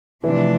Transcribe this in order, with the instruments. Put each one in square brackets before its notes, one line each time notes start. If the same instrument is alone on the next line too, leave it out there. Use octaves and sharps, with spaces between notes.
[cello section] C3 F3 A3 D4 [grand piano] E3